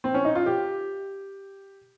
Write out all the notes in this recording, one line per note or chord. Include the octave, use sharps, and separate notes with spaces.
C4
C#4
D#4
F4
G4